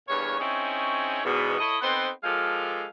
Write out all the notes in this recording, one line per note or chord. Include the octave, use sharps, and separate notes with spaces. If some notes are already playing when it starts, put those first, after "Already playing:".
E2 G2 A#2 C#5
C4 C#4 D#4 E4 G#4 C#5
E2 G#2 B2
E4 A4 C#5 D#5
B3 C4 D#4 A4 B4 C5
F3 G#3 G4 A4 A#4 F5